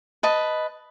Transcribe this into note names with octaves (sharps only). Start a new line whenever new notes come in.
B4 D#5 A5